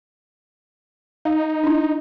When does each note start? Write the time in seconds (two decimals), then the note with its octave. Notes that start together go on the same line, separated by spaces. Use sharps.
1.25 D#4 F5
1.64 D4 E4